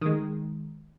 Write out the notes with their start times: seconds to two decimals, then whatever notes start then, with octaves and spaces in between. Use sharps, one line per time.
0.01 D#3 G#3